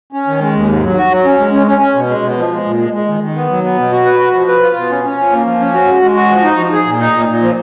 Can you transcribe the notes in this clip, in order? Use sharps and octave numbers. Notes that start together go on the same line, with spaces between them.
C#4
D#3
G#3
D#2
G#2
F#3
F#4
F#3
C#4
G#3
C#4
C#4
C#4
B2
G#3
B2
F3
G#3
A#2
G#3
G#3
D#3
D#3
B3
F#3
B3
B2
F#4
B4
F#4
F3
B4
F4
B2
C#4
C#4
F3
A#3
F3
C#4
F#4
G#3
G#3
F#4
F3
D#4
F3
G#4
A#2
D#4
A#2
A#2
F3